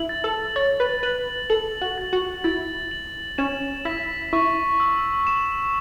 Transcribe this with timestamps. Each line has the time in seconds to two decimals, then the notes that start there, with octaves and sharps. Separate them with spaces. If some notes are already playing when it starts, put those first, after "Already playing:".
Already playing: E4 F#7
0.09 A6
0.24 A4
0.56 C#5 A6
0.80 B4
1.03 B4 F#7
1.50 A4 F#7
1.81 F#4
1.98 A6
2.13 F#4
2.44 E4 A6
2.91 F#7
3.38 C#4 E7
3.85 E4 B6
4.33 E4 C#6
4.80 E6
5.27 E7